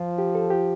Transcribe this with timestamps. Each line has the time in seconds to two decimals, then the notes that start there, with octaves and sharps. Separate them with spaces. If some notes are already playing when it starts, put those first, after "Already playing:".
Already playing: F3 F4
0.18 G4
0.35 A4
0.50 G4